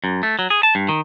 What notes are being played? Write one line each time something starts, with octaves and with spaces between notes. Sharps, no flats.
F#2
A3
F#3
G#4
A5
G2
D#3